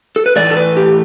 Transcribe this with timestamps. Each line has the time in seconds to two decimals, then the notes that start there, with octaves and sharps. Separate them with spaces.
0.16 A4
0.26 B4
0.36 A2 E3 A3 D5
0.51 A4
0.57 B4
0.77 G4